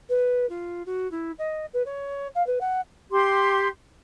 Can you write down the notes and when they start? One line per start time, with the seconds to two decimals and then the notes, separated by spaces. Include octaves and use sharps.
0.09 B4
0.49 F4
0.86 F#4
1.11 E4
1.39 D#5
1.73 B4
1.86 C#5
2.35 F5
2.47 B4
2.61 F#5
3.11 G4 C6